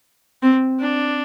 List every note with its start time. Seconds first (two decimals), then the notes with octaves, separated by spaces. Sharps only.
0.43 C4
0.81 D4